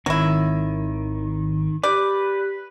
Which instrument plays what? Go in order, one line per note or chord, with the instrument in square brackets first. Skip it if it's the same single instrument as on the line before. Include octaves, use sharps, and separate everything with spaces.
[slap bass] G#1 C4 [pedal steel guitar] D#3 [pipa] F#3 E4
[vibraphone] G4 [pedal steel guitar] B4 [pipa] D5